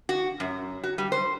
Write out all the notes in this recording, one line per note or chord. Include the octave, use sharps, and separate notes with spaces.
F#4
F#2
F#4
G3
C5